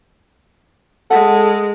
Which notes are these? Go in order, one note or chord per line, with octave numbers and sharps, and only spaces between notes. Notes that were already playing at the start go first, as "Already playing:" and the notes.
G#3 A4 E5 F#5